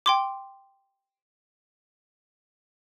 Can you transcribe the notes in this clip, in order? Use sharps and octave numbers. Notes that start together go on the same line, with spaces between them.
G5 C6 D6